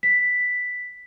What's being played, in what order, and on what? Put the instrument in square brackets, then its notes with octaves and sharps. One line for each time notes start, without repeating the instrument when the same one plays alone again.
[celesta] B6